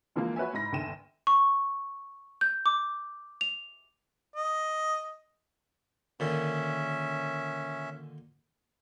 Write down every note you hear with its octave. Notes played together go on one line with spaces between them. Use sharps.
D3 E3 F3 G#3 A#3
F#4 B4 C#5 E5 G#5
G#2 E4 B5 A#6
G1 D#2 D3 G5 D#7 E7
C#6
G6
D6
F7
D#5
A#2 D3 D#3 C#4 E5